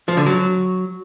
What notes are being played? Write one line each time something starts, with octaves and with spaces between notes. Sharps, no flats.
F3
D3
F#3